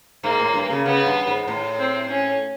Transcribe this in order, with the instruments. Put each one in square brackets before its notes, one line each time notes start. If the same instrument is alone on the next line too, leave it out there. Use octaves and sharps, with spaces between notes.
[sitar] G#2 [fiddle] A#3
[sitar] A2
G2
C#3
[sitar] C#3 [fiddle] B3
[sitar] G2
G#2
A2
[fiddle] C4
C#4